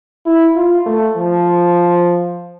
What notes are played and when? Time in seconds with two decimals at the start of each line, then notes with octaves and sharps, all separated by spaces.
0.26 E4
0.56 F4
0.86 A3
1.16 F3